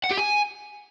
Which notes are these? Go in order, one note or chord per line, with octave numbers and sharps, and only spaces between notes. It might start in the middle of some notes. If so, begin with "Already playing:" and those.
F#5
G4
G#5